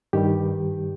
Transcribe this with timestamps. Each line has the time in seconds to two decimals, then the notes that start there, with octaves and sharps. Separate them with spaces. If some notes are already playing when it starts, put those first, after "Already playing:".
0.13 G2 D#3 G3 G4